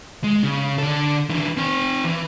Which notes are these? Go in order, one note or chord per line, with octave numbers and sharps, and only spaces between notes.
G#3
C#3
D3 A4
D3 E3
C4 G#5
E3